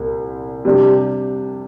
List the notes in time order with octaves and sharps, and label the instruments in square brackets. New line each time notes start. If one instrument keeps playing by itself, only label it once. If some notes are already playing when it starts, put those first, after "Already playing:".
Already playing: [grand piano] C2 A#2 A#3
C3 G3 D4 G4